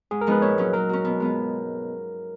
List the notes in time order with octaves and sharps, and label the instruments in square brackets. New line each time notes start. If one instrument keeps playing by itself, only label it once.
[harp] G#2 [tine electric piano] G#4
[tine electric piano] A#4
[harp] F3 G#3 B3 D#4 [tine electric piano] B4
[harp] A#2 [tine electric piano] C#5
[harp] F#3 C#4
[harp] F#3 [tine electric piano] A#4
[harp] C#4 F#4
B2
G#3 B3 F4